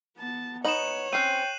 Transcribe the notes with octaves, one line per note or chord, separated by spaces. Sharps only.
B3 A5
B3 D#4 C#5 E7 F#7
C4 C#4 G5 F#6 C7 D#7